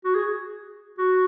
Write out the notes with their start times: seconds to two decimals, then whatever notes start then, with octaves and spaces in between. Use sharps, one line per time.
0.05 F#4
0.15 G#4
0.98 F#4